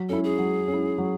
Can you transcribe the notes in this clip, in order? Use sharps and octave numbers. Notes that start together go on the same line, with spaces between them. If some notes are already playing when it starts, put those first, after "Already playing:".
Already playing: F#3
C#4 E4 A4
G#4
F#3
C#4
E4
F#3